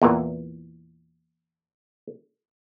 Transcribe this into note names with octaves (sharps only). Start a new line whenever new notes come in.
E2 A#2 E3